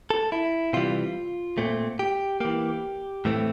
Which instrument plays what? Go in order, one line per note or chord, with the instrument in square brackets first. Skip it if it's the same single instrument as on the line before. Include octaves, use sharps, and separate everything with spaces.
[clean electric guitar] A4
E4
C3 E3 G3 F4
A#2 A3 C4
G4
E3 A#3 G4
A2 E3 A3 C4